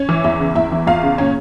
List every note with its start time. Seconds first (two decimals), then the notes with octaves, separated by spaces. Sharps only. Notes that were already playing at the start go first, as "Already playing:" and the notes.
Already playing: C#4 C#5
0.09 E3
0.24 E2 E4 E5
0.40 C#3
0.55 E2 E4 E5
0.72 E3
0.87 E2 F4 F5
1.03 C#3
1.18 A#2 C#4 C#5